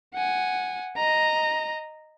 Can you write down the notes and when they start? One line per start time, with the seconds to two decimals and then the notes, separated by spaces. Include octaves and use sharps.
0.14 F#5 G#5
0.96 D#5 A#5